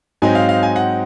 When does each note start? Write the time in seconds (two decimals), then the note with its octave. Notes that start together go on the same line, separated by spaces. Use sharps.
0.22 G#2 F#3 C4 D#4 G#5
0.35 F5
0.49 F5
0.63 G#5
0.76 F#5